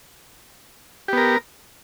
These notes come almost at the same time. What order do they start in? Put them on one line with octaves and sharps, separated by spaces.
G4 B3 A#4